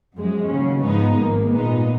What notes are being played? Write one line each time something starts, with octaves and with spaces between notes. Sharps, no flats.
F#2 F3 G#3
D#2 C#3 F#3 C#4
G#2 F3 G#3 B3 D#4
G#1 G#2 D#3 A#3
A#2 G#3 B3 D#4